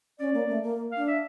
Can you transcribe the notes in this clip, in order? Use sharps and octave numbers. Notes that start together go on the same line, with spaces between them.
C#4 D5
A#3
A3
A#3
F5
D4
E5